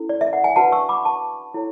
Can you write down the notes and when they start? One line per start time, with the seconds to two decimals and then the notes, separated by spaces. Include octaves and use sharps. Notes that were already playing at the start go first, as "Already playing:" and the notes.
Already playing: C#4 E4 A4
0.09 D5
0.21 E5
0.33 F#5
0.44 G#5
0.56 D4 F#4 B4 F#5 A5
0.72 C#6 E6
0.89 B5 D6
1.05 A5 C#6
1.54 E4 A4 C#5